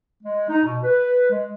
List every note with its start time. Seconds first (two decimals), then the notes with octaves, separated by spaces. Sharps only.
0.23 G#3
0.49 D#4
0.64 B2
0.83 B4
1.30 G#3